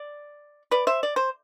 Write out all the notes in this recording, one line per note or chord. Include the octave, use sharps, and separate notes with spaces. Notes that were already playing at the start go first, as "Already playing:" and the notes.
Already playing: D5
B4 D5
C5 E5
D5
C5